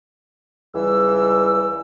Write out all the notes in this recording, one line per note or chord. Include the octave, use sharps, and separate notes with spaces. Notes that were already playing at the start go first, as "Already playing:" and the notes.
C#2 E3 G3 E6